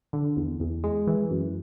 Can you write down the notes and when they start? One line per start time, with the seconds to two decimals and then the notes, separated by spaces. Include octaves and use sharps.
0.13 D3
0.37 E2
0.60 E2
0.84 G#3
1.07 E3
1.31 F#2